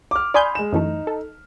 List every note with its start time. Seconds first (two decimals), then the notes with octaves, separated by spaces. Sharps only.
0.11 D6 F6
0.34 D5 G#5 B5 C6 D#6 G6
0.55 G#3 E7
0.72 F#2 E3 A3 D#4
1.07 A4